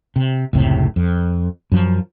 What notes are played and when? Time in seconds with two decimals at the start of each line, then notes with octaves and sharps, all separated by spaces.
0.16 C3
0.53 F1 C#2 A2 C3
0.96 F2
1.72 F#2 F3